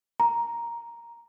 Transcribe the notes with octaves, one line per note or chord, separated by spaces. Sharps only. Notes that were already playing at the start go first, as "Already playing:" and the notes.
A#5